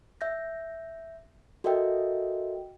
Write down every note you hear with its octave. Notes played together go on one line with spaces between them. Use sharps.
E5 G6 A#6
F#4 A4 A#4 D#5 E5 G5